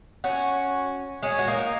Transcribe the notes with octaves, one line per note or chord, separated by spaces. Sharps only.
C#4 F#4
G#3 C#4
F#4
A#3 D#4